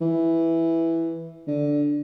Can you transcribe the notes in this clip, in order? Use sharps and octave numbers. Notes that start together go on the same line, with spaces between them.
E3
D3